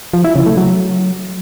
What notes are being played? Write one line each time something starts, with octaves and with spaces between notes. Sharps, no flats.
F3
E4
C#3
A3
F#3